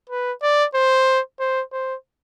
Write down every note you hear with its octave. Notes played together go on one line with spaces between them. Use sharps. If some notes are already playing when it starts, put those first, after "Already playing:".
B4
D5
C5
C5
C5